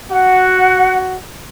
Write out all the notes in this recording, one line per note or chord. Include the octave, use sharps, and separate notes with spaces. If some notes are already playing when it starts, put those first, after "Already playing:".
F#4 F#5